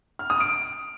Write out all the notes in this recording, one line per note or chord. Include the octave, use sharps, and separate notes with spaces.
F6
D#6
D7